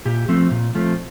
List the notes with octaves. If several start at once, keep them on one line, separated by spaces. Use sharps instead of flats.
A#2 G4
F3 A3 C4
A#2
F3 A3 C4